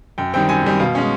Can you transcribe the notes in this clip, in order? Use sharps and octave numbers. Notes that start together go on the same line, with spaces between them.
F#2 G5
D#3 G3 C4 G5
F#2 G#5
D#3 G3 C4
B2 F5
G#3 C#4